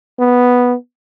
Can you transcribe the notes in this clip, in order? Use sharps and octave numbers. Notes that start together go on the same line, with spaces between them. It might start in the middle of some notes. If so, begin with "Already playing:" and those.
B3